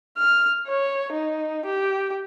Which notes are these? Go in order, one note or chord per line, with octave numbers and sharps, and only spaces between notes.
F6
C#5
D#4
G4